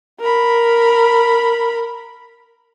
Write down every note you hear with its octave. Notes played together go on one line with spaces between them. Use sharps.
A#4 B5